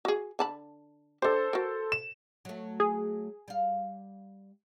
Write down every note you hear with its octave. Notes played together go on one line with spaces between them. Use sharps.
F#4 G#4
D3 A5 B5
D4 G4 A4 C5
F#4 A#4
E7
F#3 A3
G#4
G3 F5